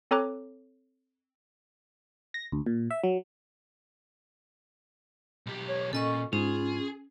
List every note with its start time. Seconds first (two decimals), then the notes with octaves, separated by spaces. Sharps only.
0.11 C4 A4 C#5 A#5 D6 F#6
2.34 A#6
2.52 D2
2.66 A#2
2.91 E5
3.04 F#3
5.46 B1 G4
5.69 C#5
5.93 A#2 C#4 A4 D#5 C#6
6.33 G#2 C#4 F4 G#4